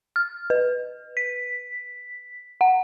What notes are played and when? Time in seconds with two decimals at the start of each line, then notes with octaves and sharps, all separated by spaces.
0.16 F6
0.50 B4
1.17 B6
2.61 F#5